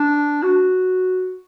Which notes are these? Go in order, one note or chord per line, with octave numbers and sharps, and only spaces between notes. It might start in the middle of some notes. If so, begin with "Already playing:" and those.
Already playing: D4
F#4